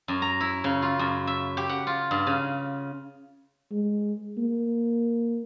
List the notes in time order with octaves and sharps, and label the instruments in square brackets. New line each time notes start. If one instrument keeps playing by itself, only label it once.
[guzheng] F#2
A#5
E4
C#3
F4
F#2
E5
G4
F#5
F4
G2
C#3
[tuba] G#3
A#3